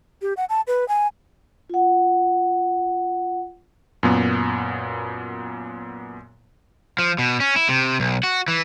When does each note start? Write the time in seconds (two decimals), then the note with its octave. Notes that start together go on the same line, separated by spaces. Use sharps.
0.22 G4
0.37 F#5
0.50 A5
0.67 B4
0.88 G#5
1.70 F4 F#5
4.03 F#2 A#2 B3
6.99 F3
7.19 B2
7.40 C#4
7.56 E4
7.69 C3
8.00 B1
8.23 F#4
8.48 E3